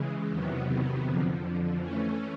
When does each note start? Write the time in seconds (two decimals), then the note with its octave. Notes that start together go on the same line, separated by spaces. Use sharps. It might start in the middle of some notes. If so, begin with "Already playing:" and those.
Already playing: C#3 E3 G#3
0.30 E2 C3 D#3 F#3 B3
1.06 F2 D3 F3
1.81 E3 A3 C#4